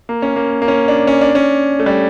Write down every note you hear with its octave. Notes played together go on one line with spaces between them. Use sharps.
A#3
C#4
A#3
A#3
C#4
D4
C#4
D4
C#4
A3
G3